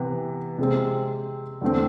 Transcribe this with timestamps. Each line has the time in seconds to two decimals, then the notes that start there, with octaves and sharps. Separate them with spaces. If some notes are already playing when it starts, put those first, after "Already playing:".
Already playing: C3 E3 B3
0.58 C3 G#3 C4
1.62 E2 D3 A3 C4